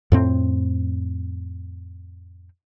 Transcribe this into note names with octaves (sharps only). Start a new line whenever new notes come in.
F2 A2 C4